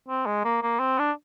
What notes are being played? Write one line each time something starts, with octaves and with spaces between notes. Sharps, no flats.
C4
G#3
A#3
A#3
C4
D4